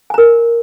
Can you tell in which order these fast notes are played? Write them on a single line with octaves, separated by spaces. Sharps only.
G#5 A#5 A#4